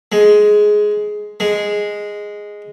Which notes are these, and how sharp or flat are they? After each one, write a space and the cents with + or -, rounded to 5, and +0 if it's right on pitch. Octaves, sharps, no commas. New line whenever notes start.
G#3 +10
G#3 -5